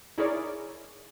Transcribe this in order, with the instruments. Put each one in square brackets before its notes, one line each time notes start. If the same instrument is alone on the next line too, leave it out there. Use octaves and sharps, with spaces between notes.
[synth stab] D#4 E4 G#4 A#4 C#5 D5